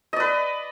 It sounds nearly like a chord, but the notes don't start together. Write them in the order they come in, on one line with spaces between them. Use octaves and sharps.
D#5 D5 B4